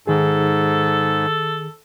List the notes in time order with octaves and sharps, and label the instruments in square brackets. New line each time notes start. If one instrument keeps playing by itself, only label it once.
[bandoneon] G#2 [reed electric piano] D#3 G#4 [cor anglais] A4